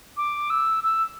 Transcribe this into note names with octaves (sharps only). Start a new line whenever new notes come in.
D6
E6
E6